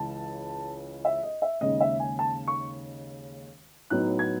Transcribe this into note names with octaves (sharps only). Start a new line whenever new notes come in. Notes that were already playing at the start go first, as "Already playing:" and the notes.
Already playing: C#2 C#3 E3 A5
E5
D#5
E5
D#2 C#3 G#3 D#5
E5
G#5
A5
C#6
A2 F#3 B3 D#4 F#6
G#6